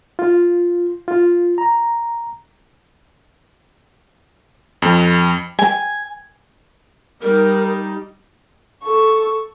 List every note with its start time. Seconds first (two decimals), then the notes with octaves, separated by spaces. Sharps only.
0.19 F4
1.08 F4
1.58 A#5
4.82 F2
5.59 G#5
7.22 G3 D#4 A#4
8.83 A4 C#6